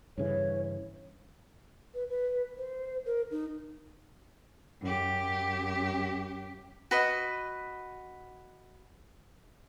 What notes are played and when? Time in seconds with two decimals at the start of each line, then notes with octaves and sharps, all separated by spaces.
0.18 G2 C#3 E3 C#5
1.95 B4
2.10 B4
2.58 C5
3.06 A#4
3.31 D#4
4.81 F#2 G4
6.91 F#4 B4 D#5